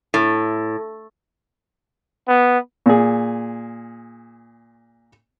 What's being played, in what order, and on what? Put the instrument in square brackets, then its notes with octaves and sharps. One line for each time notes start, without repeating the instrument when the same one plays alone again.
[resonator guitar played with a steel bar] A2
[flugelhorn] B3
[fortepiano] A#2 G#4